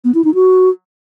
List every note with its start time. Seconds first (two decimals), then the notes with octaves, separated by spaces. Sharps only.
0.04 B3
0.14 E4
0.24 D#4
0.34 F#4